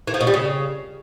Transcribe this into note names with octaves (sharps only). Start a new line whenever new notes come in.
E3
F3
B2
G3
C#3